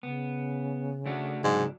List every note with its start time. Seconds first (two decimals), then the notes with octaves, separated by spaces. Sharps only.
0.03 C#3 B3
1.06 A3 D4 F#4
1.44 C2 G#2 F#3 D4